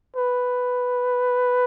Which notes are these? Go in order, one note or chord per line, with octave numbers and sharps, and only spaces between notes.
B4